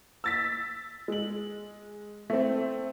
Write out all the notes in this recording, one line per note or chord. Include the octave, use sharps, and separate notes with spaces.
E6 A6 B6
G#3 F#7
A3 C4